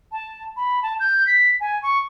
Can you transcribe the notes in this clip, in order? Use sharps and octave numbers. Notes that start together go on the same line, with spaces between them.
A5
B5
A5
G6
B6
G#5
C#6